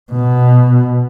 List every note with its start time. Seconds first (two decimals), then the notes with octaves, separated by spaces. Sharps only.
0.12 B2